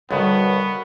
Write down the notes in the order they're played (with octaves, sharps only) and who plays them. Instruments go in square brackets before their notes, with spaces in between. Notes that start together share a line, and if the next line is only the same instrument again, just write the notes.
[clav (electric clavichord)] B1 G2 [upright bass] D3 G3 [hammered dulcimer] A#3 F#4 F#5 [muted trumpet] B3